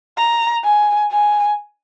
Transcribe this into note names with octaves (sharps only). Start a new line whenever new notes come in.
A#5
G#5
G#5